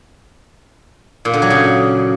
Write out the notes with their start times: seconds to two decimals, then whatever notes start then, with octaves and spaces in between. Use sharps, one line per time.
1.25 A#2
1.34 D3
1.42 F#3
1.50 C#3